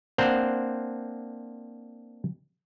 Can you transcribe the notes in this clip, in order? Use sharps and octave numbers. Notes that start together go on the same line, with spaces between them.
A#3 C4 D4 C5 F#5 A#5